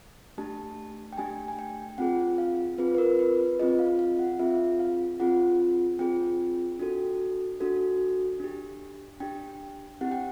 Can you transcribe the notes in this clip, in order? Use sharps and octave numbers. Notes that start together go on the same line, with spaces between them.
A3 D4 G4 A5
G5
A3 D4 G4 G#5
G#5
G5
C4 F4 G#4 F#5
F5
C4 F4 G#4 B4
B4
A#4
B4
B4
C4 F4 G#4 D#5
F5
F5
F#5
C4 F4 G#4 E5
F5
C4 F4 G#4 F#5
C4 F4 G#4 G5
D4 F#4 A4
D4 F#4 A4
D4 G4
D4 G4 G5
C4 E4 G4 F#5
G5